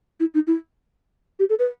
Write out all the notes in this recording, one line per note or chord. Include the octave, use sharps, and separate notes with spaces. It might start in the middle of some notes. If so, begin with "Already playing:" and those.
E4
D#4
E4
G4
A4
B4